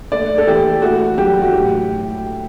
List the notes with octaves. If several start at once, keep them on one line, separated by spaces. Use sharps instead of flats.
A3 D5
A4
E3 G4
A3 F#4
F#3 G4
F#4
A2 G4